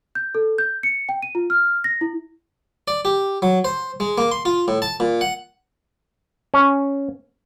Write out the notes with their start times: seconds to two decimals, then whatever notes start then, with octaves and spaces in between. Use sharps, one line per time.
0.15 G6
0.35 A4
0.58 G6
0.83 C#7
1.09 G5
1.22 D#7
1.35 F4
1.50 F6
1.84 A#6
2.01 E4
2.88 D5
3.05 G4
3.42 F#3
3.65 C5
4.00 G#3
4.18 A#3
4.31 C6
4.45 F4
4.68 A2
4.82 A5
5.00 A#2
5.21 F#5
6.54 C#4